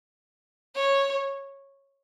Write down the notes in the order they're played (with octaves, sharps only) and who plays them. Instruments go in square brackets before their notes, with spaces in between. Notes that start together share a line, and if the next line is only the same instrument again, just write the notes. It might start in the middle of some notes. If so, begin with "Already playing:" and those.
[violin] C#5